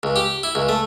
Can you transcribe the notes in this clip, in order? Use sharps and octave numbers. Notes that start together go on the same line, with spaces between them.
C#2
G4
E4
C#2
A3